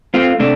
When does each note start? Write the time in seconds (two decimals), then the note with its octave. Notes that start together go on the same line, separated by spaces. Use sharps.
0.14 A3 C4 F4
0.39 C3 A3 D4